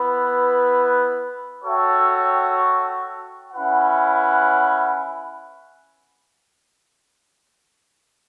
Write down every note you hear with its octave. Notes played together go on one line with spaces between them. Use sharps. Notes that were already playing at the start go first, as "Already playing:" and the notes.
Already playing: B3 E4 B4
F#4 A4 C#5 E5 G5
C#4 E4 B4 F#5